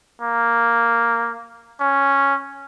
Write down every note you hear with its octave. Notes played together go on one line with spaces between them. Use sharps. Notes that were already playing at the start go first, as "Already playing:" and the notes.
A#3
C#4